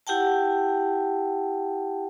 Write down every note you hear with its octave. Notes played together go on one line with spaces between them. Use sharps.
E4 G4 F#5 G5 A5